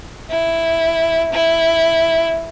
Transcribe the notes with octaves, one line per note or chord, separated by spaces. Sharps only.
E4
E4